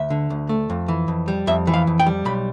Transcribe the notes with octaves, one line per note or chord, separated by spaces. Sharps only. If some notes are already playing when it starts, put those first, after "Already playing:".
Already playing: D2 E5
D3
D2
A3
F2
E3
F2
G3
F2 E5
E3
F5
F2
G5
G3
B1 B5